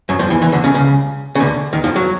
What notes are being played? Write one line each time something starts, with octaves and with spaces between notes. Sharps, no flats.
F#2 F#3
F2 F3
E2 E3
E2 E3
D2 D3
C#2 C#3
C#2 C#3
C#3
D2 D3
D#2 D#3
F2 F3
F#3